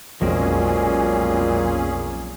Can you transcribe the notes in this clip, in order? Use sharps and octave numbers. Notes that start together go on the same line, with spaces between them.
B1 F2 A#2 F#3 G#3 C4 C#4 G#4